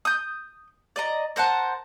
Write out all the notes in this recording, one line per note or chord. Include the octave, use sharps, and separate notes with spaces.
D#6 G6
D5 D#5 A#5
A#4 C5 F#5 A5